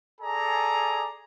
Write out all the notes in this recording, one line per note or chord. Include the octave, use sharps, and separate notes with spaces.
G#4 A4 D5 G#5 A#5